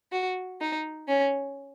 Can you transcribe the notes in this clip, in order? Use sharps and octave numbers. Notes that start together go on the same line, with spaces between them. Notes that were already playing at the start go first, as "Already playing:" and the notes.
F#4
D#4
C#4